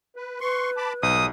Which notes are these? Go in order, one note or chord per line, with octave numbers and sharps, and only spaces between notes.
B4
B4 C6 C#6
A5 B5 D6
B1 G#2 G3 D#6